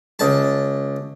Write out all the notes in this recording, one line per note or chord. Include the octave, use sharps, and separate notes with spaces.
C#2 A5